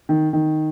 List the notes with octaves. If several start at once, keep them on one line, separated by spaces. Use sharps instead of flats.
D#3
D#3